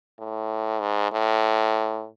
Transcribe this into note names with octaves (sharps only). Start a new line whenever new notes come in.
A2
G#2
A2